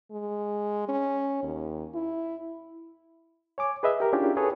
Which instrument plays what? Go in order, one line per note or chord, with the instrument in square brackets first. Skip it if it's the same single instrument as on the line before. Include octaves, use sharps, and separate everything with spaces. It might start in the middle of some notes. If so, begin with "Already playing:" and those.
[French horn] G#3
C#4
D#2
E4
[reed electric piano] C#5 G#5 D6
G#4 B4 D#5 E5
G4 A#4
C#4 D4 E4 F4 G4 G#4
G#4 A4 B4 C#5